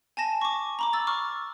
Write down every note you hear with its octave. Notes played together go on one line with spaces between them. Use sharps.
G#5 A5 A#6 E7
C#6 D6
A#5 B5 D6
E6 A6
C#6 D6 F6